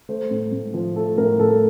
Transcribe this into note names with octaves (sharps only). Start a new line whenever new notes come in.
A3 C5
A2
A2
F3
A3 A4
A2 A#4
A2 A4